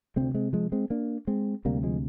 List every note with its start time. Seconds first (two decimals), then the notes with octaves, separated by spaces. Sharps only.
0.16 D2 C3 G#3 C4
0.34 G#3 C4
0.53 F3 G#3
0.72 G#3 C4
0.90 A#3 D4
1.27 G#3 C4
1.65 D2 C3 G3 A#3
1.83 F3 G#3